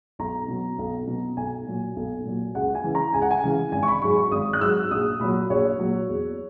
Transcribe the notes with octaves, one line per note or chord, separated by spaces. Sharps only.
B1 A#5
B2 F#3
B1
B2 F#3
B1 G#5
A#2 F#3
B1
A#2 F#3
C#2 F#5
G#5
C#3 E3
A#5
C#2 G#5
F#5
G#5
C#3 E3
G#1 G#5
C#6
B5
G#2 F#3 C#6
C#6
G#1 D#6
F#6
G#2 F#3 E6
A#1 D#6
A#2 F#3 B5
A#1 C#5
A#2 F#3
E2